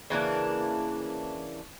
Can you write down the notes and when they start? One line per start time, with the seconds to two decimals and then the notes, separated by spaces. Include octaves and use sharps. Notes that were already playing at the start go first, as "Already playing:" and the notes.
0.10 C#3 E3 A#3 D4